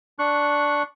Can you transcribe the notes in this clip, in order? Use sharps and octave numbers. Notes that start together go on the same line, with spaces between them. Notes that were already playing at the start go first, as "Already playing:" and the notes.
D4 C#6 F#6